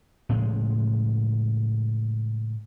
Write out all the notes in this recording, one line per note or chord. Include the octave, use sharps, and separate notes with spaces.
A2 C#3 F3 G#3